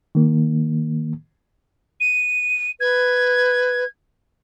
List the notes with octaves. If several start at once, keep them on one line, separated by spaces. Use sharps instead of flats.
D#3 A#3
D#7
B4 G#6